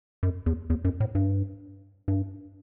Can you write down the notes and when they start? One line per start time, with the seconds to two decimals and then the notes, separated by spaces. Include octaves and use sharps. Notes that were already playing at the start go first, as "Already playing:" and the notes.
0.23 F#2
0.46 E2
0.70 E2
0.85 F#2
1.00 A2
1.15 G2
2.08 G2